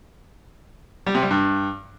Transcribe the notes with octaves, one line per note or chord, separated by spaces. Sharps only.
G3
C3
G3
G2